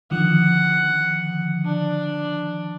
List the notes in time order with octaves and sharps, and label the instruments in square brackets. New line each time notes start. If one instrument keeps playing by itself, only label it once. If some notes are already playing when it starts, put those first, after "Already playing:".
[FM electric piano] D3 D#3 F3 [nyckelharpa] F#5
[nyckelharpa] D4